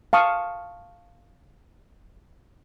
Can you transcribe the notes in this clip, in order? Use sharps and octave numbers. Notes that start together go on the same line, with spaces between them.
F5 A5 C#6 D#6